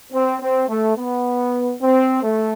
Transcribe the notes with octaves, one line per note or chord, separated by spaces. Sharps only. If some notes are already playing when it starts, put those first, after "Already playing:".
C4
C4
A3
B3
C4
A3